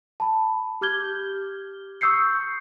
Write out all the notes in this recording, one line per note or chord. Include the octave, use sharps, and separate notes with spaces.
A5 B5
G4 D6 F6 G6 G#6 G7
C#6 D#6 E6 G6 C7 C#7